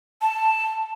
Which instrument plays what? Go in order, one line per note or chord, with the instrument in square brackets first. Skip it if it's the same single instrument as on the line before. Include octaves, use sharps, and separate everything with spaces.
[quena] A5